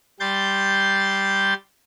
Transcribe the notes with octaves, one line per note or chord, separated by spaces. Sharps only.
G3 C6 G6 A6